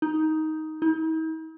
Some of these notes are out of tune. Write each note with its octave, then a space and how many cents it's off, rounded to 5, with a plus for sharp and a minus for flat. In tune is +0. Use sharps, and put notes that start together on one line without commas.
D#4 +10
D#4 +45